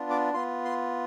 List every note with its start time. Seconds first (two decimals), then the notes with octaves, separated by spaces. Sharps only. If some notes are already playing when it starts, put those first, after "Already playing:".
Already playing: B3 D4 F4
0.10 D6
0.33 B3 F4 C6
0.65 C6